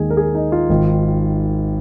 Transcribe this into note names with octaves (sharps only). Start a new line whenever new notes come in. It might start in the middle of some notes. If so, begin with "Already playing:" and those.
Already playing: D#2 D#3 G#3 G#4
A#4
G#4
D#4
F4
G#1 G#2 D#3